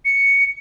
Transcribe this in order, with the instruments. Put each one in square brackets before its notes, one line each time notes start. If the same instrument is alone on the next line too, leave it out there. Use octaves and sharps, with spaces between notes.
[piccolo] C#7